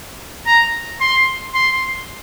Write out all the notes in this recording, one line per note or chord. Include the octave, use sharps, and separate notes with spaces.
A#5
C6
C6